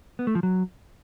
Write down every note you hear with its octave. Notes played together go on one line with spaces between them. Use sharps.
B3
A3
F3
F#3